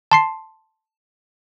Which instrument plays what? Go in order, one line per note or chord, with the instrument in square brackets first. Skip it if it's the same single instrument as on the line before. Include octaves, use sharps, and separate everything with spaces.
[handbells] A5 C6 C7